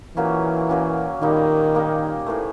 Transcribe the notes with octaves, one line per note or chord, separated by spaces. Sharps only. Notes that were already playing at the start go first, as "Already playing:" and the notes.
A#2 E3 F#3 A#3 C#4
A#2 F#3 A#3 C#4
A#2 D#3 G3 A#3 D#4
A#2 G3 A#3 D#4
A2 E3 A3